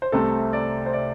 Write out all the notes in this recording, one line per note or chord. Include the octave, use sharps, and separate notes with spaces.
C5
C2 C3 A3 C4 A4
D5
C5
D5